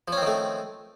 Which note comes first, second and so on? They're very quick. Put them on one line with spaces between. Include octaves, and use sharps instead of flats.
F3 C#4 C4 D#3 A3